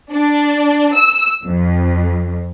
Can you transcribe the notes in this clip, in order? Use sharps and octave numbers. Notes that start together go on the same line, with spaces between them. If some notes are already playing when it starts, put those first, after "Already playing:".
D4
E6
F2